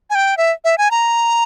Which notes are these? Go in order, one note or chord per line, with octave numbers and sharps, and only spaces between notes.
G#5
G5
E5
E5
G#5
A#5